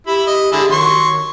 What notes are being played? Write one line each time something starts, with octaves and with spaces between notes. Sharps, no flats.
E4 G4 B5
D#5
D3 G#3 E4
D#3 F#3 C6 C#6